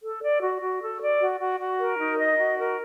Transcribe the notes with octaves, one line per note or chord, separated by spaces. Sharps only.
A4
D5
F#4
F#4
A4
D5
F#4
F#4
F#4
A#4
D#4
D#5
F#4
A#4